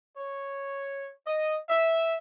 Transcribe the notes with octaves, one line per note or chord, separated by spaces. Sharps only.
C#5
D#5
E5